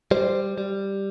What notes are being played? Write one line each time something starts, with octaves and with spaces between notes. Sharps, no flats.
G3 C5
G3